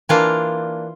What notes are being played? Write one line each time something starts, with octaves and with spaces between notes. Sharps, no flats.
E3 A#3 D4 F4